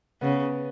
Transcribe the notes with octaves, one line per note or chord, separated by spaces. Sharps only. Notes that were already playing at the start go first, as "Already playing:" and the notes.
C#3 B3